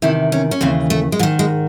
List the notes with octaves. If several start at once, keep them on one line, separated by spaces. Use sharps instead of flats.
E2 C3 D#3 E4
C#4
C#4
D#2 C#3 E3 C4
A3
G#3
G#2 D#3 F#3
G#3